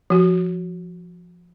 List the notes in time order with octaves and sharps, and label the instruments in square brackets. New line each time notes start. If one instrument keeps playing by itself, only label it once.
[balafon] F3 F#4